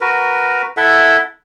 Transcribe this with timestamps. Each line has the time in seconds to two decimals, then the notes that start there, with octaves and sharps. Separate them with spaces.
0.01 F#4 A#4 B4
0.77 E4 A4 E5 F#5